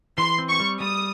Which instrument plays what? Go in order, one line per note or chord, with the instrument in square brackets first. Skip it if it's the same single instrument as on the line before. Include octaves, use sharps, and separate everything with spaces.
[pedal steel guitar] E3 [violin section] C6
[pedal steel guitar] C4
[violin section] C#6
[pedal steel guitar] G3
[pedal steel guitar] G3 [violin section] D#6